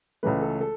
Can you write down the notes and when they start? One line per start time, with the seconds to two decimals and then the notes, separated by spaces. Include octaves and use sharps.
0.23 C#2 C#3 E3 A3 B4
0.42 A4
0.61 A4